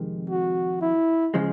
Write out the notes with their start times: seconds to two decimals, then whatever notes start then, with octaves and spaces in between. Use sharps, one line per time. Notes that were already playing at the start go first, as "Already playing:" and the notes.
Already playing: F2 C3 D#3 G#3
0.30 F#4
0.81 E4
1.34 C#3 F3 G#3